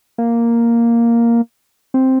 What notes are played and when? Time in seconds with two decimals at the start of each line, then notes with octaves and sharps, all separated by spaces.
0.18 A#3
1.94 C4